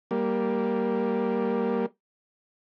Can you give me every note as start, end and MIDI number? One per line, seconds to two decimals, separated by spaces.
0.11 1.86 55
0.11 1.86 58